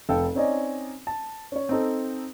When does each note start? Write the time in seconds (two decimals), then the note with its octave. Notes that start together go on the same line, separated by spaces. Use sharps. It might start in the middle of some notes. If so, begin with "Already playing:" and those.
0.09 F1 A4 F5 G5
0.35 C4 C#4 D#4 D5 D#5 G#5
1.07 A5
1.52 C#4 C#5
1.69 C4 D#4 A4